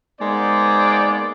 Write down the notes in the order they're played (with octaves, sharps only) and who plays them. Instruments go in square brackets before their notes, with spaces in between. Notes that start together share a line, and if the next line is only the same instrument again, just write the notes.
[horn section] G#3 A#3 B3 D#4 C5 D5